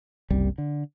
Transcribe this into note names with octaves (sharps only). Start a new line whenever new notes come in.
F#1 C2 G3
D3